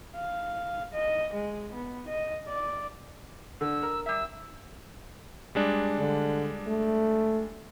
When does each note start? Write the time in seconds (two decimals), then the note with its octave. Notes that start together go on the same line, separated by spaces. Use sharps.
0.16 F5
0.93 D#5
1.33 G#3
1.73 B3
2.08 D#5
2.48 D5
3.61 D3 E6
3.82 A#4
4.06 G3 E5 E6
5.55 G3 G#3 D4
5.99 D3
6.67 A3